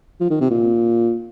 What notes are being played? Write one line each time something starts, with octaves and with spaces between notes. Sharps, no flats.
F3
D#3
C3
A#2